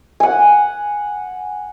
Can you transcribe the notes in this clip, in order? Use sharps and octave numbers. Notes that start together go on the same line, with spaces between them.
F#5 G#5